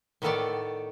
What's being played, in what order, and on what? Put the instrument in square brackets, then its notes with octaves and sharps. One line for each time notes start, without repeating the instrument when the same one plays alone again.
[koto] A2 D#3 B3 A4 C#5 D5